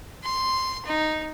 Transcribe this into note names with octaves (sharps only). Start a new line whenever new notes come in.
C6
D#4